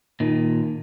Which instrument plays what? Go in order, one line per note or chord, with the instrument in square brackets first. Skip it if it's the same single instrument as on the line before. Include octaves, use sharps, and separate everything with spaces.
[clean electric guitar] A#2 D#3